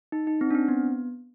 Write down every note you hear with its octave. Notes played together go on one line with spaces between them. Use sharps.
D#4
D#4
C4
D4
C4
B3